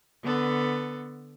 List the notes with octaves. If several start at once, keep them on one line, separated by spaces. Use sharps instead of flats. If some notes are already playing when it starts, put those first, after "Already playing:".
D3 B3 A4 B4